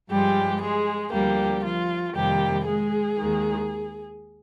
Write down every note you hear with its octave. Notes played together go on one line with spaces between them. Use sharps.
G2 F3 G3 G#3 G4
G#3 G#4
D2 D3 F3 G3 A#3 G4
F3 F4
F2 C3 D#3 G3 A#3 G4
G#3 G#4
D#2 D#3 G#3